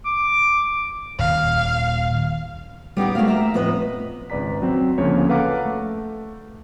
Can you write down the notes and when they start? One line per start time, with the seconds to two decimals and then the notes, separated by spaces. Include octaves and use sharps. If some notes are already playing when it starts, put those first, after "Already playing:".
0.06 D6
1.19 D#1 F5
2.97 G3 B3 D#4 G4
3.15 A3 A#3 F#4 F5
3.28 E5 A#5
3.54 F2 A2 B3 B4 D#5
4.30 G#1 C#2 B4 D5 A#5 B6
4.62 F#3 C4
4.98 D2 C#3 F3 A#3 C#5
5.29 A4 B4 F5 F#5 A#5 D6
5.66 A3